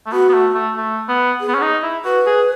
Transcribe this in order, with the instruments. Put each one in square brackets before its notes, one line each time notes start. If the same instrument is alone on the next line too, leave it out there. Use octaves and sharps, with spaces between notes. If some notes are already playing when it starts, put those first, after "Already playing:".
[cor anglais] A3
[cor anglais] B3 [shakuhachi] F#4
[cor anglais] B3
A3
A3
A3
B3
[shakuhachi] G#4
[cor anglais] B3
C#4
D#4
E4
[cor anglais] F#4 [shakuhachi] B4
[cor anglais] G#4